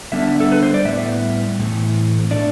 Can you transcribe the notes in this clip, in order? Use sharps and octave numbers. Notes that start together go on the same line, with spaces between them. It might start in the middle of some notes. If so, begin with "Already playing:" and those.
D3 G3 B3 D4 E5
A4
B4
C5
D5
A2 G3 B3 E5
A2 E3 A3 C4
B2 A3 D4 D5